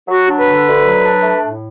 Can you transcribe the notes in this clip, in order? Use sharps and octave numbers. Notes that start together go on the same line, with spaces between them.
F#3 F#4
D4
B4
D3
D2
F#3
D4
A3
A2